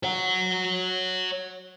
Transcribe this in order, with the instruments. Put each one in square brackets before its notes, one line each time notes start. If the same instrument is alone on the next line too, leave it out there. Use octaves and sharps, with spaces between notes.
[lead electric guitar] C#5 F#5